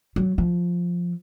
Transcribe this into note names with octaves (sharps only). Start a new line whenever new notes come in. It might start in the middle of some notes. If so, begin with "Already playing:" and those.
F#3
F3